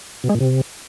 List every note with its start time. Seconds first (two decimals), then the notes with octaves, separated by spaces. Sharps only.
0.24 B2
0.29 G#3
0.35 A#2
0.40 C3